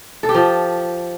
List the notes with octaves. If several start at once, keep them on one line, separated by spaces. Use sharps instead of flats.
A4
G4
F3